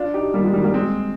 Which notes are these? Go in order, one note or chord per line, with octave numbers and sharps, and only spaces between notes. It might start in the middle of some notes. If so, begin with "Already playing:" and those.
Already playing: D4 F4
D#4 G4
G3 A#3
F3 G#3
D#3 G3
G3 A#3
G#3 C4